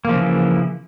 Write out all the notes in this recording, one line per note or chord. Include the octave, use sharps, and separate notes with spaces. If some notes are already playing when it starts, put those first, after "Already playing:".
C#3 E3 F3 A#3